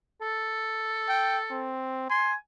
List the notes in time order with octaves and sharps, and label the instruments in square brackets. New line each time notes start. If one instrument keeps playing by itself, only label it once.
[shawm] A4
[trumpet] G5
C4
[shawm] G#5 [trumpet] C6